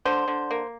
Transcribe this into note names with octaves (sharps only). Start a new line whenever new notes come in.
D3 C5
D3
A#3